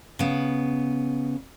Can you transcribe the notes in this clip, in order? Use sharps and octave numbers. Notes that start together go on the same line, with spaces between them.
C#3 B3